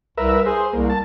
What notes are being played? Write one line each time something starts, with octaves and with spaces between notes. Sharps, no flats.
C2 A#4 B4 E5
G#4 C5
C2 A#3
A5